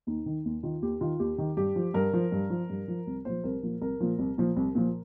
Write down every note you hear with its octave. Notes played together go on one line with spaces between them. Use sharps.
D#2 D#4
D#3
D#2
D#3 F4
D#2 G4
D#3 F4
D#2 G4
D#3
G2 G4
F3
G2 A#4
F3
G2
F3
G2
F3
C2
A#2 F3 C5
C2 A#4
A#2 F3
C2 A#4
A#2 F3
C2
A#2 F3
C2
A#2 F3